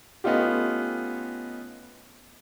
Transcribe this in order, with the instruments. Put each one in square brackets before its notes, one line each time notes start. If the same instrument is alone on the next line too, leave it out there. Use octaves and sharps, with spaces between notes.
[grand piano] A3 B3 C#4 D#4 F4 G4